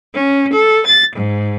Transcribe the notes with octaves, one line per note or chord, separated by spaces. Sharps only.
C#4
A4
A6
G#2